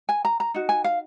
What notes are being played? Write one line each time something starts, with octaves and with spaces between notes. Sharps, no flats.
G#5
A#5
A#5
D#4 F#4
G#5
F5